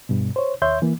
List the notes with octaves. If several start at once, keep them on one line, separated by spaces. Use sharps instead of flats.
G2 B2
C5 C#5
D#2 C#5 E5 C6 G6
E3 A#3